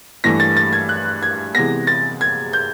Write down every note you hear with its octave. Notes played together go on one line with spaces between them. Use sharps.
G2 E3 A3 A#6
A6
A6
G#6
F#6
G#6
C3 E3 G#3 B3 A#6
A6
G#6
G6